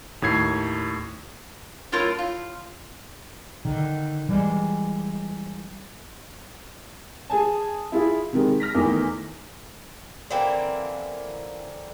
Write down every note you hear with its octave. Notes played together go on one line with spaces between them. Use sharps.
D#2 A2 G#6 C7
F#2 A2 F4 A#4 C#5
F4
D3 D#3
E3 G3 G#3
G#4 G#5 A5
E4 F4 G#4
C3 D#3 G#3
F6 A#6 B6
E2 D#3 E3 A3 D6
D3 E3 A#3 C4